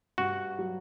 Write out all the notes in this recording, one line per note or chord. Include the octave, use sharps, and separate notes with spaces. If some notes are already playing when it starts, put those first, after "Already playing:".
G2 F#4
F#3